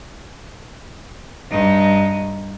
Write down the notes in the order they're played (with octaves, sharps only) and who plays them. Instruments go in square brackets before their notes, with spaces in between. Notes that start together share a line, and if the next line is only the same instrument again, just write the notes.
[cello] G2 D#4